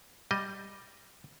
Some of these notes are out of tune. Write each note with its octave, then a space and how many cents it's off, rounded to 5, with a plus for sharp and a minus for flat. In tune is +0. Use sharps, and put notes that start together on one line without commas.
G3 +0 D#5 +0